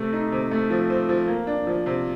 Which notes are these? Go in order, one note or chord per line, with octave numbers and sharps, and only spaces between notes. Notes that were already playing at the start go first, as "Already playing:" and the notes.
Already playing: C3 A3
D#4
C3
A3
F3
C4
F3
A#3
D4
F3
C3